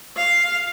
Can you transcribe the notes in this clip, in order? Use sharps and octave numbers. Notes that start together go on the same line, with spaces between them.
F5